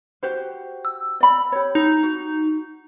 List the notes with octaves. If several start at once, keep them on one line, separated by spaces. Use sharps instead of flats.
F#4 G4 C5
E6
D5 B5
G4 C#5
D#4
F#4